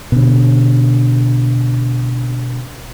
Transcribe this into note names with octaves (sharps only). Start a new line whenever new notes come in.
B2 D3